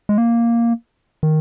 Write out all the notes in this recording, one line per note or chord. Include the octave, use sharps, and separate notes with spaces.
G#3
A#3
D#3